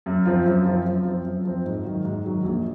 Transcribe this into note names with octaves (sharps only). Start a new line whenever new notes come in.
F#2
F3 C4 F4
F#2
F3 C4 F4
F#2
F3 C4
F#2
F3 C4
G#2
D#3 F#3
G#2
D#3 F#3
A#1